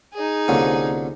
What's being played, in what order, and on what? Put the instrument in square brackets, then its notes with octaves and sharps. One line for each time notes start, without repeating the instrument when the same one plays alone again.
[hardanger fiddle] D#4 G#4
[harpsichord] C2 D3 [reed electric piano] A#3 C#4 F4